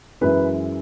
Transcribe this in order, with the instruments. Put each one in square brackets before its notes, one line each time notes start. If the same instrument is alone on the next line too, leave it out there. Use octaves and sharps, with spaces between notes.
[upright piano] F#2 E3 G#3 B4